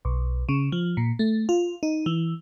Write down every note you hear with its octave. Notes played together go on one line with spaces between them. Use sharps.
B1
C#3
F3
A#2
A3
F4
D#4
E3